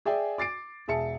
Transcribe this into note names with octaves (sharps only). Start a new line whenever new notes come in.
G#4 D5 E5 G5 G#5
D6 A6 C7 D7
E1 G#4 E5 A5 C#7